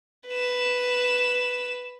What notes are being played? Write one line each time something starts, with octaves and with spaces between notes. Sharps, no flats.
B4 E7